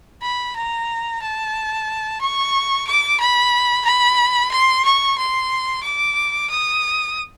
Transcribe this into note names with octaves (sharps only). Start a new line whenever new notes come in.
B5
A#5
A5
C#6
D6
B5
B5
C6
C#6
C6
D6
D#6